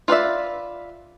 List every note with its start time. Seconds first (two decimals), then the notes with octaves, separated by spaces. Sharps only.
0.08 F4 B4 D5 E5